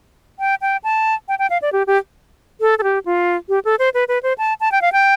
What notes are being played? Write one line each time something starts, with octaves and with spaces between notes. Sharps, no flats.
G5
G5
A5
G5
G5
F5
D5
G4
G4
A4
A4
G4
F4
G4
A4
C5
B4
B4
C5
A5
A5
G5
F5
G5